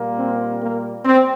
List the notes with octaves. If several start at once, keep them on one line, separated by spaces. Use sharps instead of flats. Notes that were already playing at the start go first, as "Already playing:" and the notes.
Already playing: A#2 G3 A#3
C4
A#3
C4